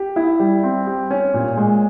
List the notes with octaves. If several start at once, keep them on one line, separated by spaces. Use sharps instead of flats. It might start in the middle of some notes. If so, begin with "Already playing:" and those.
Already playing: G4
E4
G3
C4
G4
C#4
A#2
G#3